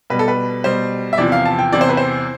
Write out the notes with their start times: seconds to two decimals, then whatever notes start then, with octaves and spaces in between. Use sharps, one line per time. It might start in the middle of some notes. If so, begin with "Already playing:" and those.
0.10 B2 G3 B4
0.19 A4
0.28 B4
0.64 B2 G3 C5
1.13 E5
1.18 E2 C3 F3 D5
1.32 F5
1.45 A5
1.59 G5
1.72 E2 C3 E3 D5
1.81 C5
1.89 B4
1.97 C5